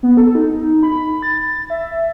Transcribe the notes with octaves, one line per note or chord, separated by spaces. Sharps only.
B3
A4
D#4
B5
A6
E5